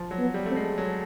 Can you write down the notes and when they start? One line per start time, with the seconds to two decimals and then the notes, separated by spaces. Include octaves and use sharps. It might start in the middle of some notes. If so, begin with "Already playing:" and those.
Already playing: F3
0.11 F#3
0.18 B3
0.34 G3
0.46 A3 C4
0.56 G#3
0.78 F#3